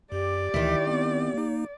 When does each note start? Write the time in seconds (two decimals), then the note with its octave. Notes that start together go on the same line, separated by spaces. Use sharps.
0.12 F#2 G4 D5
0.54 D2 D#3 E3 E4 B6
0.87 B3 C4
1.34 A#3 D#4